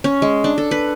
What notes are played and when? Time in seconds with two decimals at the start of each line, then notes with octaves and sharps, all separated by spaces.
0.04 C#4
0.22 G#3
0.44 D4
0.58 A4
0.71 B4